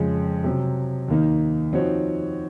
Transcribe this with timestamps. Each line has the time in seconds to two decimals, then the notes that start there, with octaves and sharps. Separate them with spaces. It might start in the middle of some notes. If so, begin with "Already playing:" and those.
Already playing: F2 C#3 G#3
0.44 C3 F#3 C4
1.08 D#2 D#3 A#3 D#4
1.73 F3 C4 D#4 F#4 C#5